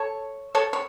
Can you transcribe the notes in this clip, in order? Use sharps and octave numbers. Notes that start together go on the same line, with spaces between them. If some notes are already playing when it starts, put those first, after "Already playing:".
Already playing: A4 C#5
A4 C#5
C#5